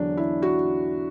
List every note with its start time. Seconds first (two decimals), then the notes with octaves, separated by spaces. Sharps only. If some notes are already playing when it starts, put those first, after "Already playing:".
Already playing: E2 D3 F#3 D4
0.17 E4
0.42 F#4